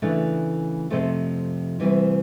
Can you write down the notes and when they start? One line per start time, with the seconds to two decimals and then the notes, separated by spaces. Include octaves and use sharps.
0.02 C#3 E3 A3 D4
0.90 F2 C3 F3 A3
1.80 D2 C3 E3 G3